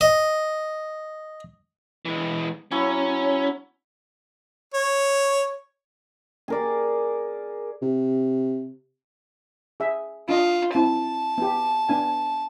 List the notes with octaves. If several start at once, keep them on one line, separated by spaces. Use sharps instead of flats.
D#5
E3 G#3
F#3 C#4 E4
C#5
G#4 A#4 D5
C3
G#4 E5
D4 F4 D#5
C4 E4 A5
B3 G4
B3 D4 G#5